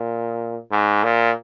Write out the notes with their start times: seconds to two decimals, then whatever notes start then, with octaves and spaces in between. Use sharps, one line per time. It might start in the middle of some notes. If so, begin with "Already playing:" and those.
Already playing: A#2
0.71 G#2
1.04 A#2